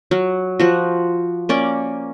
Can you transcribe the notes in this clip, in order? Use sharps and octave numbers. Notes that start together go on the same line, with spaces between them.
F#3
F3 F#4
A#3 C#4 D5